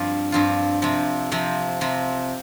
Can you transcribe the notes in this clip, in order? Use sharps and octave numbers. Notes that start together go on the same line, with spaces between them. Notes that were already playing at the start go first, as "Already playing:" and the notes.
Already playing: G2 F3 C4 F4
G2 F3 C4 F4
C3 F3 C4
C3 F3 C4
C3 F3 C4